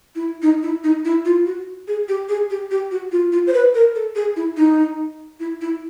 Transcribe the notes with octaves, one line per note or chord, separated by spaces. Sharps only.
E4
D#4
E4
D#4
E4
F4
F#4
G#4
G4
G#4
G4
G4
F#4
F4
F4
C5
B4
A#4
A4
G#4
E4
D#4
E4
E4